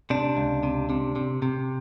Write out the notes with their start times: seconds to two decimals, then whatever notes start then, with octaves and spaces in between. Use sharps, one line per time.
0.10 C3 D4
0.37 C#2
0.63 C3
0.90 C3
1.16 C3
1.42 C3